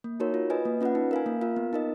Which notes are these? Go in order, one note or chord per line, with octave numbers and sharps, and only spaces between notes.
A#3
D#4 F#4 A#4 C#5
F4
B4 D#5 G#5
A#3
C#4 F4 B4 F#5
D#4
A#4 F5 G#5
A#3
F4 A#4 F5
B3
D#4 A#4 D#5